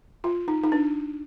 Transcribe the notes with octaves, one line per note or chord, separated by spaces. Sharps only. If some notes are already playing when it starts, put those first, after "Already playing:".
F4
D#4
D#4
D4